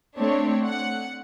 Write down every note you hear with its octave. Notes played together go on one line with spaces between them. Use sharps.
A3 C4 D4 C#5
F#5